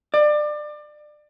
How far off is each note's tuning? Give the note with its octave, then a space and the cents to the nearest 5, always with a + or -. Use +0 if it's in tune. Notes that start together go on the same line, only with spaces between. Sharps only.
D5 +25